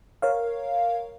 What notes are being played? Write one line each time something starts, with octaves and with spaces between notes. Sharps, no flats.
A#4 C#5 F5